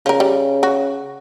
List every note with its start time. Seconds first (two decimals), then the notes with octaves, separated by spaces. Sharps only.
0.06 C#3 F3 A#4
0.20 G3
0.63 F#4